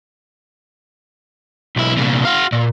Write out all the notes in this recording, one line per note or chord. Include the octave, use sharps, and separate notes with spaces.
B1 E4
C2 A#2
F#4 F5
A#2